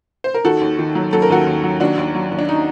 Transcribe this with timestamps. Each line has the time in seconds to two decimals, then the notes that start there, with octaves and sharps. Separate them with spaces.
0.24 C5
0.34 A#4
0.45 D#3 F#4 A4
0.61 D#2
0.78 D#3
0.95 F#3
1.13 F#3 A4
1.22 A#4
1.30 D#2 F#4 A4
1.47 D#2
1.63 F#3
1.80 D#2 D4 F#4
1.97 D#2
2.14 F#3
2.31 D#2
2.38 D4
2.49 D#4